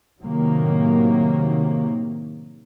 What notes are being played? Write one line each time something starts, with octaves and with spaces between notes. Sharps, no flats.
A2 C3 D#3 F#3 A#3